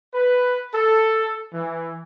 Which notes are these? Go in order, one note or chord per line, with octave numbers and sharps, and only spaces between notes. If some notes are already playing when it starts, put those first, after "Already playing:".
B4
A4
E3